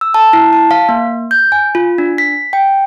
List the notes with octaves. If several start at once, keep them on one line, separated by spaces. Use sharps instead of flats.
E6
A5
E4
A5
F5
A#3
G6
G#5
F4
D4
B6
G5